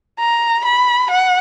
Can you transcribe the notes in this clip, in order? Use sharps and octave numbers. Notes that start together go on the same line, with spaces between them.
A#5
B5
F#5